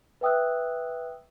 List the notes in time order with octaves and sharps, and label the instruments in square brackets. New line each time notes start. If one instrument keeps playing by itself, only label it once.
[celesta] B4 E5 G5 D#6 E6 F#6